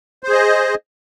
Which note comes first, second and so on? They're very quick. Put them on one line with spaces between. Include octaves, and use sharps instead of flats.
C5 G#4 D#5